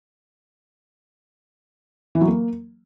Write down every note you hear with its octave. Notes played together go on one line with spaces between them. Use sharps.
E3
F#3
A#3